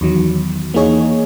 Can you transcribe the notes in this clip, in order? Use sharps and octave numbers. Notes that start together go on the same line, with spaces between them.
E2 D#3 F#3
E3 A#3 D#4 G#4 C#5